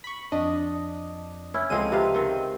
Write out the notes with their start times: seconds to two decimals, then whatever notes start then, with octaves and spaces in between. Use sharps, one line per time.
0.04 B5 C#6
0.32 F2 D4 D#5
1.54 C#4 E4
1.70 C#2 D3 F3 G#3 C4 D#7
1.92 C3 B4 F5
2.14 D#3 C4